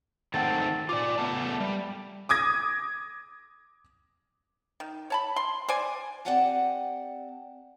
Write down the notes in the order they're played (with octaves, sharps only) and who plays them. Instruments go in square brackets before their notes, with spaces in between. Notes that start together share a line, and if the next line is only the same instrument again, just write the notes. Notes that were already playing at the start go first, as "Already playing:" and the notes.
[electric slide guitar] D#3 A3 C4 [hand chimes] F#5 A5 A6
[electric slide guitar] F4 D5 [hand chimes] D6
[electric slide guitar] A3 B3 A5
G3
[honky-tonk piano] D6 D#6 G#6 A#6
[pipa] D#3
C#5 A5 B5
C6
C5 D5 G#5
[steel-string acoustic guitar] C4 G4 D5 F#5 G#5 A5